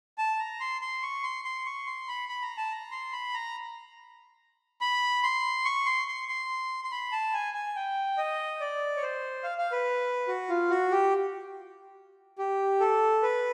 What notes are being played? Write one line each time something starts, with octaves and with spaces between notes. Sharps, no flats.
A5
A#5
C6
C6
C#6
C6
C6
C#6
C6
B5
B5
A#5
A5
A#5
C6
B5
A#5
B5
C6
C#6
C6
C6
C6
C6
B5
A5
G#5
G#5
G5
D#5
D5
C#5
C5
F5
F5
B4
F#4
F4
F#4
G4
G4
A4
B4